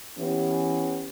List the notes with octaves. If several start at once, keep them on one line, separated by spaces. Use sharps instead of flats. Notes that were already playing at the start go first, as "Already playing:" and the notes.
E3 B3 C#4 G4